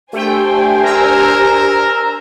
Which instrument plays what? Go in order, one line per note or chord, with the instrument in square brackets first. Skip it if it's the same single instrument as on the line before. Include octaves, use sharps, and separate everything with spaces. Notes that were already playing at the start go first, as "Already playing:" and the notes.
[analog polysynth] A3 G5 [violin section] D4 C5 G#5 [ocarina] G4
[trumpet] A#4 [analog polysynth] A#5 E6